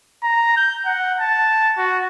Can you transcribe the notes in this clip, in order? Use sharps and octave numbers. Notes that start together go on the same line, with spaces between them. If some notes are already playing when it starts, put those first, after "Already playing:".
A#5
G6
F#5
A5
F#4